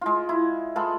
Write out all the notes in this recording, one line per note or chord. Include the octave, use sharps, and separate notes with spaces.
G#3 F4
E4
G#3 F4 A4 B4